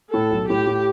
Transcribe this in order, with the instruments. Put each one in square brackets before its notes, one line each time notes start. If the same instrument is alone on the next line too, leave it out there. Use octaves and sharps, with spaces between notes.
[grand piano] A2 [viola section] A4
[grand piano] B1
[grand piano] A2 [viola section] G4
[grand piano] A2